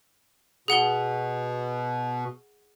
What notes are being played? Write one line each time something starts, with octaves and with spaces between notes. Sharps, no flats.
B2 G#4 F#5 G7